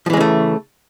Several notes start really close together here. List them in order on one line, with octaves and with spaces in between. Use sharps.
F3 E3 G#3 C#3 A3